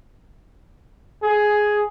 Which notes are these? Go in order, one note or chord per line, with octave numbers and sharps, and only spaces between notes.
G#4